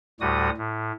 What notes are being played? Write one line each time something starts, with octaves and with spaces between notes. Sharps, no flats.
D2 A2 G3 F#4 D#6
A2